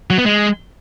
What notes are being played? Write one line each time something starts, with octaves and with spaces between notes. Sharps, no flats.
F#3
B3
G#3